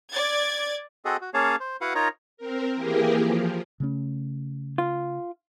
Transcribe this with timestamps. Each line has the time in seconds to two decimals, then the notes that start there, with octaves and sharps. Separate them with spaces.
0.11 D5 G#6 A6
1.05 C4 F#4 G#4 A4 D#5
1.21 F#4
1.34 A#3 C#4 G#4 C#5 F5 A5
1.60 C5
1.81 E4 F#4 B4 F5 F#5
1.95 D#4 F4 A#4 C#5 A#5
2.37 C4 A#4
2.75 E3 A#3 G4 G#4 A#4
3.15 F3
3.80 C#3 A3 C#4
4.78 F4